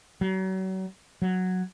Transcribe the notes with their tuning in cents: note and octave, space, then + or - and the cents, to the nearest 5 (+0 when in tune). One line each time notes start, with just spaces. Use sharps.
F#3 +35
F#3 -5